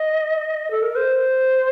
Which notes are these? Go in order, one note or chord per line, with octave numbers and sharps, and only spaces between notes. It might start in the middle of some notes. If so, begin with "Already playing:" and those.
Already playing: D#5
A4
A#4
C5